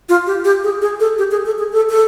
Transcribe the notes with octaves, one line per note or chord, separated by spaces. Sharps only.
F4
G4
G4
G#4
G#4
A4
G4
G#4
A4
G#4
A4
A4